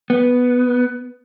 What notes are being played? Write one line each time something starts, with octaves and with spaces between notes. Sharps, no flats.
B3